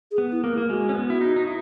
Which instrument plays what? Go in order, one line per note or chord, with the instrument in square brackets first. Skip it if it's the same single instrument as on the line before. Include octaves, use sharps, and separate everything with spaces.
[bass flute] G#4
[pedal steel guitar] B3
[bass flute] E4
[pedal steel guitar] A#3
A#3
[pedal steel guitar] G#3 [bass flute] F#4
[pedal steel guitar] C#4
B3
[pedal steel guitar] E4 [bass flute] F#4
[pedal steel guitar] D#4
D#4
E4